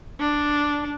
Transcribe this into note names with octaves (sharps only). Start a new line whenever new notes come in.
D4